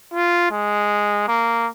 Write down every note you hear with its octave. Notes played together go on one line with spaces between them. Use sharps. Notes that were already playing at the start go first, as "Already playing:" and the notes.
F4
G#3
A#3